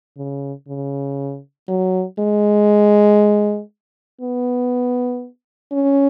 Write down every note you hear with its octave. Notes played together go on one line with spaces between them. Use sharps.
C#3
C#3
F#3
G#3
B3
C#4